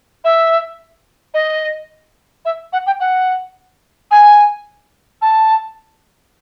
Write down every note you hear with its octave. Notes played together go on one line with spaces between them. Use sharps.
E5
D#5
E5
F#5
G5
F#5
G#5
A5